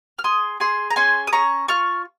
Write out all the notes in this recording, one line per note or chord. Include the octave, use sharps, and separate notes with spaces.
F6
G#4 C6 D#6
G#4 G#5 C6
A#5
C#4 G#5 C6
D#6
C#4 A#5 C#6
F4 C#6 F6